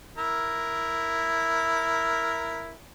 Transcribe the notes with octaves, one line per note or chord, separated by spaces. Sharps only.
E4 A#4